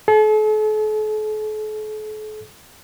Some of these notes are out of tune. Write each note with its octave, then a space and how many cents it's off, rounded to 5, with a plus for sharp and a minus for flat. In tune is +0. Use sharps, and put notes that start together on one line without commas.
A4 -45